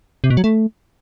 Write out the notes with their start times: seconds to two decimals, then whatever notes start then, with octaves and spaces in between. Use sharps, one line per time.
0.24 C3
0.30 B2
0.37 F#3
0.44 A3